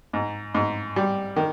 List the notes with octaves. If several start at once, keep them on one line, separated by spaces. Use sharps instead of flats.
G#2
G#2
G3
D#3